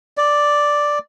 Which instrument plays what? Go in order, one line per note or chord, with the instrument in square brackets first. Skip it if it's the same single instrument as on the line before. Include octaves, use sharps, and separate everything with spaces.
[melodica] D5